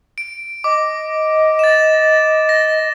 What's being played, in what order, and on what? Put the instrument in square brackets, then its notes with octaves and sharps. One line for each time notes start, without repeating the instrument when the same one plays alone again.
[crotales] D7
[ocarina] D#5 [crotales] D6
[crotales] A6 E7
A#6